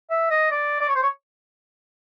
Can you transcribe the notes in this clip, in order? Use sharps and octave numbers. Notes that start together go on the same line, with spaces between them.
E5
D#5
D5
D5
C#5
C5
C#5